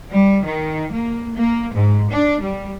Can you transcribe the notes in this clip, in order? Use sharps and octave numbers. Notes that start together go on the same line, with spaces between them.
G3
D#3
A#3
A#3
G#2
D4
G3